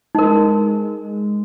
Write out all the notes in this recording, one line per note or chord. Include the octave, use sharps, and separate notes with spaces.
G#3 D#4 A#4